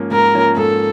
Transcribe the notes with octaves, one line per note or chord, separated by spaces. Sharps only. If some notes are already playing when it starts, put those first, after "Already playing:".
Already playing: G#2 F3 A#3 C#4
G#2 A#4
F3 A#3 C#4
G#2 A4